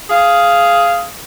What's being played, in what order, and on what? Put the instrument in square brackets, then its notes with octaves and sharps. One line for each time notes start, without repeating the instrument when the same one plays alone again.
[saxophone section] G#4 F5